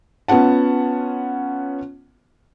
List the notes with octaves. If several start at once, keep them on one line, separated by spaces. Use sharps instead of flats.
B3 C#4 F4 F#5 A5